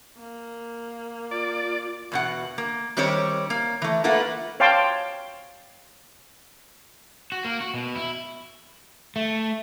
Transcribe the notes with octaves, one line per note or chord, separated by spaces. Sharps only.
A#3
F4 D5
E2 B2 F#5
A#3
D#3 G3 C4 G4 C#5
A#3
E3 A3
A3 A#3 F4 B4 F#5
C#5 F5 G5 A5 C6 D6
F#4
A#3
F#4
B2
E4
A3